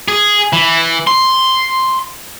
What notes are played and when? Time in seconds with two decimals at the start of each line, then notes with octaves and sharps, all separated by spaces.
0.08 G#4
0.53 E3
1.07 C6